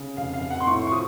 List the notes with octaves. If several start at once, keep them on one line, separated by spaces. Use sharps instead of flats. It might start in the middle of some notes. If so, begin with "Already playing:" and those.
Already playing: C#3
F1 F5
F5
F1
F#5
C6
A2 C#6
C#6
F3 D#6